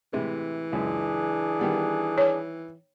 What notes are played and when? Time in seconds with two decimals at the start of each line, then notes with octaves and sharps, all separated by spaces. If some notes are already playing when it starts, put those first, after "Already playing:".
0.13 A2 C3 E3 G#3
0.73 C#2 F#2 D4 G#4
1.59 D#3 G3 B3
2.18 C#5